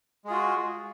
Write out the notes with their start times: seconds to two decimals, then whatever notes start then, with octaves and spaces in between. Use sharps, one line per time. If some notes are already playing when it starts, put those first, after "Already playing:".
0.25 G#3
0.27 G#4
0.30 F4
0.33 F#4